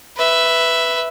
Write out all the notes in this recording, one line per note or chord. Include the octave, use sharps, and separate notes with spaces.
B4 E5